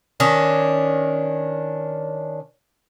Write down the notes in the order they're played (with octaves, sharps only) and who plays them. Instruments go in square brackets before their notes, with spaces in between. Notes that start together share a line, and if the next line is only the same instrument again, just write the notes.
[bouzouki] D#3 C#4 D4